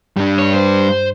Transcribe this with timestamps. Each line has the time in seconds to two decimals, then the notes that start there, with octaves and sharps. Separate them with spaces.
0.17 G2 G3 D4
0.39 C#5
0.54 C5